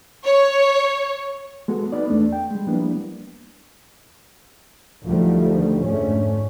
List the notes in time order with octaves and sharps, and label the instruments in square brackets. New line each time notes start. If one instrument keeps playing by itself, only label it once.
[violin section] C#5
[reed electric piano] G#3 B3 F#4 A4
B3 D#4 D5
E2 A3 D4
G5
G3 G#3
F3 G3 A#3 B3 D4 E4
[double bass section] D2 D3 D#3 F3 G3 A3
F2 G#2 D3 A3 C#4